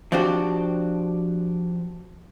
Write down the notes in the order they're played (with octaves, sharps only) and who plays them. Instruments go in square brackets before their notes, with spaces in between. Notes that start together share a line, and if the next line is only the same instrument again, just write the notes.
[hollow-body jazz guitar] F3 C4 D4 F#4 G4